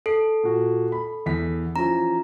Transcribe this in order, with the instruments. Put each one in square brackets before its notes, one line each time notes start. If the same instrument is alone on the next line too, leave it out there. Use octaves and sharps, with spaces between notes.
[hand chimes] A4 [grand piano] C7
[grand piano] A#2 F#4
B5
E2 B6
[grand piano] E3 F3 C#4 [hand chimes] A#5